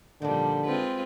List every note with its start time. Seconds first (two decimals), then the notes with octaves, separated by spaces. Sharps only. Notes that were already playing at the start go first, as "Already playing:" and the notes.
0.22 A#2 D3 D#3 F3 G3 D4
0.66 G#3 C4 F4 B4